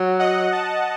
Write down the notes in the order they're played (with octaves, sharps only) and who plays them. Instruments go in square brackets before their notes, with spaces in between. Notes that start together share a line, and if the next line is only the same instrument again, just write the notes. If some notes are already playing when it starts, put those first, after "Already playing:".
Already playing: [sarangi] F#3
[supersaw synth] D#5 F#5
F#5 A5